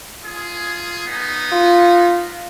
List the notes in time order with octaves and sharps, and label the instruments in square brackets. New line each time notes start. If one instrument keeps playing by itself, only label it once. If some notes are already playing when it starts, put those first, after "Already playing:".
[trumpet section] F4 G#4
B3 D#4
[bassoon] F4